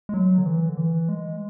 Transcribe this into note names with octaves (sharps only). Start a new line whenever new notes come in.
G#3
F#3
D3
E3
D3
E3
G#3